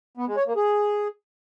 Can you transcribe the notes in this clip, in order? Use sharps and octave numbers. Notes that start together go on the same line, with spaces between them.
B3
G#3
C#5
A#3
G#4